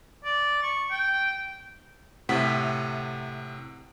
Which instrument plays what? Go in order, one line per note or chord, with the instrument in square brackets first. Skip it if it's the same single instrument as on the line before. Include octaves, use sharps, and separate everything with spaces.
[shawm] D5
C#6
G5
[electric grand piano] A2 C3 F#5 B6